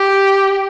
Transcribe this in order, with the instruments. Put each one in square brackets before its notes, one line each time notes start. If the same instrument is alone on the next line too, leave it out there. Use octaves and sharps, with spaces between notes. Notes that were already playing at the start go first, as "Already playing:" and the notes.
Already playing: [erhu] G4